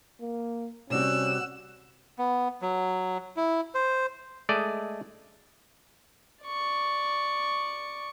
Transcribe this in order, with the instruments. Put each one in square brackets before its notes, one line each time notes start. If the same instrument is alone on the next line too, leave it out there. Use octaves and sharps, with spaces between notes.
[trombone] A#3
[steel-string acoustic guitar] C3 G3 F#4 [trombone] C#4 [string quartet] E6 F#6
[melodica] B3
F#3
E4
C5
[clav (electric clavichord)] G#3 A3 D5 D#5
[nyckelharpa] D5 C#6